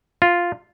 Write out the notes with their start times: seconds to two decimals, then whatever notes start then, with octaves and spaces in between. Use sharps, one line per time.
0.22 F4